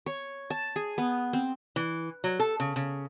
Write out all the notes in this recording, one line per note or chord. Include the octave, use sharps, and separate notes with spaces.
C#5
A5
G#4
B3
C4
E3
F#3
A4
C#3
C#3